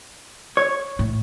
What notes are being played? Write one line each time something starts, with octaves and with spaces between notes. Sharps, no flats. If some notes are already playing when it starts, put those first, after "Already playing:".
C#5
A2